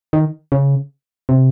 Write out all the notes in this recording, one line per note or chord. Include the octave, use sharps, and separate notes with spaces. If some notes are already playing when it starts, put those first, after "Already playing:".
D#3
C#3
C3